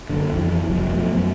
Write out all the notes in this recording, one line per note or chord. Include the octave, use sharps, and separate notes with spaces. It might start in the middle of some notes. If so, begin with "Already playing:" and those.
F#1 D3
F2 E3 F3
F1 F2 F#3
B2 F3 A3
F#2 F#3